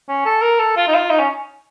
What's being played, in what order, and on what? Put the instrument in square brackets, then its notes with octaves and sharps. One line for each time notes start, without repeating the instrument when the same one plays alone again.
[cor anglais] C#4
A4
A#4
A4
F4
D#4
F4
D#4
C#4